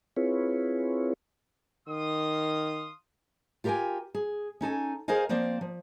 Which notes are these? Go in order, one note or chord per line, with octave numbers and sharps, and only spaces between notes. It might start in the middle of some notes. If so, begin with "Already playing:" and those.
C4 E4 F4 G#4 B4 C#5
D#3 F5 C6 D#6
F4 G4 A#4 C#5 G5 G#5
G#4
C#4 D#4 A4 G#5
G#4 A#4 C5 D#5 F5 G#5
F3 A#3 C4 C5 D5
F3